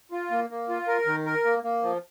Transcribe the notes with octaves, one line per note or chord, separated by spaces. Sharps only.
F4
A#3
A#3
F4
A#4
D#3
A#4
A#3
A#3
F3